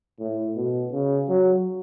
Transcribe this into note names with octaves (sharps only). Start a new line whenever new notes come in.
A2
B2
C#3
F#3